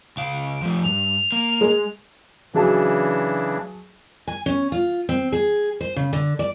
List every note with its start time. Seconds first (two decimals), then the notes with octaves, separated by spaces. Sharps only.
0.17 C#2 F5 D7
0.62 F3 A3
0.83 G2 F7
1.32 A#3
1.61 G#3
2.54 C#3 E3 F#3 D4 G#4 A5
4.27 G#5
4.46 C#4
4.72 F4
5.09 C4
5.32 G#4
5.81 C5
5.96 C#3
6.13 D3
6.39 D5